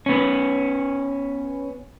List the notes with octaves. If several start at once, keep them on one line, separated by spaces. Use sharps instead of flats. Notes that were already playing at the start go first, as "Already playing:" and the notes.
B3 C#4